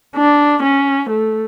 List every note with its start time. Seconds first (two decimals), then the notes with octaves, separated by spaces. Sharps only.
0.16 D4
0.63 C#4
1.10 A3